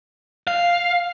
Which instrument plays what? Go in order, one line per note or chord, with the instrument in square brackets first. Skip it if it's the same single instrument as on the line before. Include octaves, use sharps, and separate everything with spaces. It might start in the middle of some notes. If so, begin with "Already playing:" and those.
[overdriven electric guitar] F5